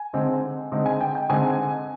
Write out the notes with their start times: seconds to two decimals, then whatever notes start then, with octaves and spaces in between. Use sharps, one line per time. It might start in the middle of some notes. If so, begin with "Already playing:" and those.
Already playing: G#5
0.13 D3 G#3 C4 D#4
0.72 D3 G#3 C4 D#4
0.86 G#5
1.01 G5
1.15 G5
1.30 D3 G#3 C4 D#4 G#5